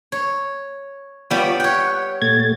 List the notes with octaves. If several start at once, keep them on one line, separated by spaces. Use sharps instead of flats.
C#5
G3 B3 F4 C#5 D6
C#5 F#5 G5
A#2 A3 G#6 A6